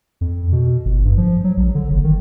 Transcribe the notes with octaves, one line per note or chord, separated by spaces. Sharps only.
F2
B2
G1
G2
F3
F#3
A#1
D3
F#1
D#3